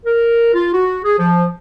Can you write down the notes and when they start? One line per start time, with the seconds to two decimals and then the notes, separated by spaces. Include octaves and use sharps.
0.06 A#4
0.54 F4
0.74 F#4
1.04 G#4
1.19 F3